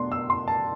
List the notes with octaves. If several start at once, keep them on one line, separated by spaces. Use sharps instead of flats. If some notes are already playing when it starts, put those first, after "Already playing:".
Already playing: B2 A3 D4 C6
E6
C6
A5